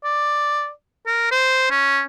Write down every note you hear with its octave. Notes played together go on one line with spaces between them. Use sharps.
D5
A#4
C5
C#4